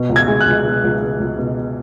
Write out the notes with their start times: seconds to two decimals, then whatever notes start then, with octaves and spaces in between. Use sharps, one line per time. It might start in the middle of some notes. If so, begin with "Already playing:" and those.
Already playing: B2
0.09 C#2
0.16 G#6
0.28 G#3
0.41 F#6
0.46 C#2
0.65 B2
0.84 C#2
1.01 G#3
1.20 C#2
1.38 B2